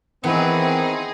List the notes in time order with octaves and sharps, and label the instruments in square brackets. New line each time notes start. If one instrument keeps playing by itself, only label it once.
[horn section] D#3 C4 [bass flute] E3 [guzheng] B3 [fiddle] D#4 G#4